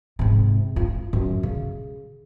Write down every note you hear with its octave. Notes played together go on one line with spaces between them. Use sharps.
G#2 C3
F4
F#2
C#3